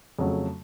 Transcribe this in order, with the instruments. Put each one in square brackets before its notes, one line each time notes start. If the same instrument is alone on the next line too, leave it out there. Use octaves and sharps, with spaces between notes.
[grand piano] F2 C#3 F#3 A3